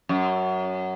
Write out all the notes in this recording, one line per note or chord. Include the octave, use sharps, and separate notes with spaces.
F#2